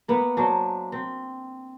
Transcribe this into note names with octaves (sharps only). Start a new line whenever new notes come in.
A#3 B3 B4 F#5
F#3 D4 C5
C4